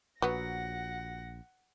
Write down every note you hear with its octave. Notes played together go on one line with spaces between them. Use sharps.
A#1 F#3 B3 F#5 A#6